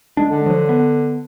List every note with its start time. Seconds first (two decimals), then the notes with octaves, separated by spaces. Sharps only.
0.17 G#3 D4
0.30 D3
0.46 F3 F#3
0.69 B3